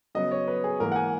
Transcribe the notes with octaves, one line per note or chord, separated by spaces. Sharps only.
C#3 F#3 B3 D#5
C#5
B4
G#4
G#2 E3 A#3 A#4
F#5
G#5